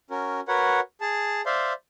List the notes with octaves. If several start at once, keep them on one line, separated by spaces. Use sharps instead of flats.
C#4 F#4 A#4
F#4 A#4 B4 C#5 F#5
G#4 A5
C5 D5 E5 F5 C6